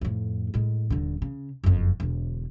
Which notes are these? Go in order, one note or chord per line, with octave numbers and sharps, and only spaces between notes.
F2 A2
A2 G#3
D#1 D3
C#3
F#1 F2
E1 D3